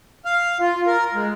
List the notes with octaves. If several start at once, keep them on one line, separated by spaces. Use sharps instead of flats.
F5
F4
A#4
G#3